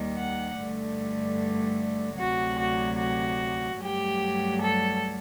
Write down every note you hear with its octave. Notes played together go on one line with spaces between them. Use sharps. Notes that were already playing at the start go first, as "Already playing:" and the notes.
Already playing: D#2 D#3 G3
F#5
G2 D3 A3
D2 C3 F#3 F#4
F#4
F#4
G2 F#3 A3 G4
A4